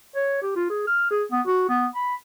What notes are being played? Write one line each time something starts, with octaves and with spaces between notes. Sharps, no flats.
C#5
G4
F4
G#4
F6
G#4
B3
F#4
B3
B5